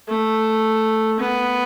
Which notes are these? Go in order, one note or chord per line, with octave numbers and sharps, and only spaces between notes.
A3
B3